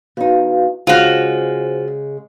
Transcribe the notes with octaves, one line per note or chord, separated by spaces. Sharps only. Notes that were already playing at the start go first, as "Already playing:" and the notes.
E2 D#4 F#4 B4 F5
C#3 G#3 F4 F#4 C5